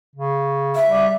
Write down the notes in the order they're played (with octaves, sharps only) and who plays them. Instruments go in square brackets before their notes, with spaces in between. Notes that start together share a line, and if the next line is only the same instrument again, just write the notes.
[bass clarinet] C#3
[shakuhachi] E5
[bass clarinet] G3